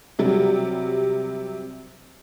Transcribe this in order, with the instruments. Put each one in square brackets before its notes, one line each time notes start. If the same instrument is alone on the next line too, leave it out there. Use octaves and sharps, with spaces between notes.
[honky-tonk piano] C3 F#3 G3